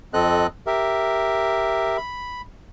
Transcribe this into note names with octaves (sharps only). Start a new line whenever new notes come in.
F2 C4 A4 D#5 F#6
G4 A#4 E5
B5